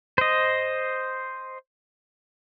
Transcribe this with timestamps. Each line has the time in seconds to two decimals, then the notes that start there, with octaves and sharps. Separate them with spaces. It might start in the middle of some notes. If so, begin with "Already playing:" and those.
0.18 C5 D#5